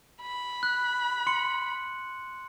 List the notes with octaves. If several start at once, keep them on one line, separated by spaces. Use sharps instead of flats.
B5
F#6
C6 C#7 F#7